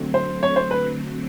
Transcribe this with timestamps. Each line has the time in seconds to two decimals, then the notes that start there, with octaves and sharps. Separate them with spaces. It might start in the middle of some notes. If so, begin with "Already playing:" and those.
Already playing: D3 F#3 A3 C4
0.14 C5
0.43 C#5
0.56 C5
0.71 B4